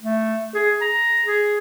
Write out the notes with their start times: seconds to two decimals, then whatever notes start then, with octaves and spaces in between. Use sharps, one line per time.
0.03 A3
0.55 G#4
0.81 A#5
1.26 G#4